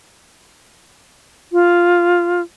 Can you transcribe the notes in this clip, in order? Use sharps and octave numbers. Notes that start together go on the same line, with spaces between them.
F4